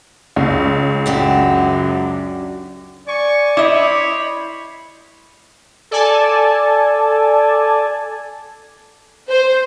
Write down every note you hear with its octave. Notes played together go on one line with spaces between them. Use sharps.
C#2
F#2 D4 F#4 G4
D5 G#5 C#6
E4 C5 C#5 D#5 B5 D6
A4 D5 G#5 A5
C5